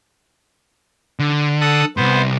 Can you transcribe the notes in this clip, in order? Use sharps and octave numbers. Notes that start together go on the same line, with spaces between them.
D3
A4 F#5 D#6
C2 G2 B3 C5